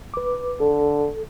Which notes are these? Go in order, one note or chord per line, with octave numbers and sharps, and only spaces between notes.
B4 D6
D3 A4